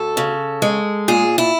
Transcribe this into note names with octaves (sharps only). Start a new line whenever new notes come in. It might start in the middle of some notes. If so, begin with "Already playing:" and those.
Already playing: D2 A4
C#3
G#3
A#2 G#4
E4